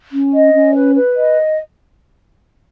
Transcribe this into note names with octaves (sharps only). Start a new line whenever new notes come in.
C#4
D#5
C#4
B4
B4
D#5